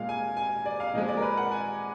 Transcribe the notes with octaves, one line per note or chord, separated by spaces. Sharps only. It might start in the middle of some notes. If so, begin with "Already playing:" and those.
Already playing: A#2 G#3 F5
G#5
G#5
D5
F5
A#2 F3 G#3 D#5
D5
A#4
B4
F#5
G#5